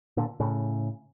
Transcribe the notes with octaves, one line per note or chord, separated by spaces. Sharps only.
A#2 D3
A2 C#3